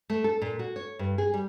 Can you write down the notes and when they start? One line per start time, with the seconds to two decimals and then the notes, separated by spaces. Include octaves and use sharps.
0.10 A3
0.24 A4
0.42 A#2
0.59 F#4
0.76 C#5
0.99 G2
1.18 G#4
1.34 G3